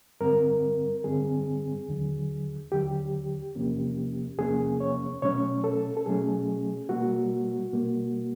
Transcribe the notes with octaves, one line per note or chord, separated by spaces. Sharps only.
G2 D3 G3 C4 A#4
G2 D3 G3 C4 G#4
D#2 D3 F#3
D#2 D3 F#3 G4
E2 C3 F3 A#3 C#4
E2 C3 F3 A#3 C#4 G#4
C#5
B2 F#3 A3 C#4 C#5
A4
A4
B2 F#3 A3 C#4 G#4
B2 G3 A#3 F#4
B2 G3 A#3